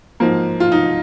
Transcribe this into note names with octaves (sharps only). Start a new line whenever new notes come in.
G#2 F3 A#3
F4
D#4